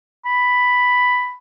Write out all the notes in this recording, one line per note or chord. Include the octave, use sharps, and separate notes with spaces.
B5